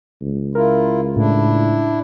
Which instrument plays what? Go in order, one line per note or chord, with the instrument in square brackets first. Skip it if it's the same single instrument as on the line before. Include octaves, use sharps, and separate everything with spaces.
[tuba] C#2
[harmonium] E4 F4 [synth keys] A#4
[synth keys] A2 [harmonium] D4 E4